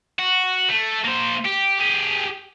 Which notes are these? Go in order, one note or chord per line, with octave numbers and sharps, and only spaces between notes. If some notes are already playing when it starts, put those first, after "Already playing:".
F#4
A3
A#3 C5
G4
G4 G#4